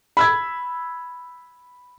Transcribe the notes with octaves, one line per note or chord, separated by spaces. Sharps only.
B5 E6 G#6